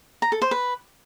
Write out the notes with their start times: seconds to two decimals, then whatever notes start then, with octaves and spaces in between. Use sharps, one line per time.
0.22 A#5
0.32 A4
0.42 C5
0.51 B4